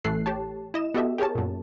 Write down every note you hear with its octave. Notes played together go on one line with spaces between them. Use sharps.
A1 E3 A3 A4 F#6 C7
G4 C#5 A5
E4 D#5 E7
B3 F#4 G4 A4 D#5 E5
G4 G#4 A#4 C#5 A5
F#2 A#2